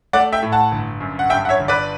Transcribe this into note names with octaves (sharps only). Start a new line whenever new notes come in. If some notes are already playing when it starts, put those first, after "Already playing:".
A3 D5 F#5
E5 G5
A2
F#5 A5
G1
F#2
F#5
G2 E5 G5
F#5
C#5 E5
G1
B4 D5